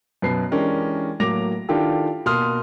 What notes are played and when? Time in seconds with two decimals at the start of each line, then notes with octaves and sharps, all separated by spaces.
0.22 F#2 B2 B4 C7
0.51 E3 G#3 C#4 D4 G4 A#4
1.20 A2 F#3 A#3 D6 A#6 F7
1.69 D#3 D4 E4 F4 G4 A4
2.26 B2 A#3 C6 D#6 F6